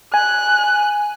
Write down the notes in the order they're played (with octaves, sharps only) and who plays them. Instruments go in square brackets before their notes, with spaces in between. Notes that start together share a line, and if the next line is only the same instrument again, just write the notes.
[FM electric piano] G#5 [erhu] F#6